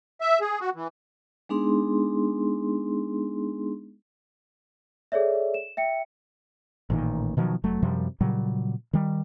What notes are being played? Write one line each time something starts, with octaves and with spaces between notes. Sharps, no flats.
E5
G#4
F#4
E3
G#3 B3 D4 D#4 G#4 C6
G#4 A4 C#5 D5 E5
E7
E5 G5 C#7
A1 A#2 D#3
B2 D#3 F3 F#3
F1 F#3 A3
F#2 C3 F3 G3
A#2 C#3 F#3 G3
D#3 G3